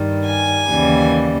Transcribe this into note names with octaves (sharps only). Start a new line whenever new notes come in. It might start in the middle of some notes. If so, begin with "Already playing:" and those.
Already playing: G2 D#3 G3
G#5
D#2 C#3 E3 G3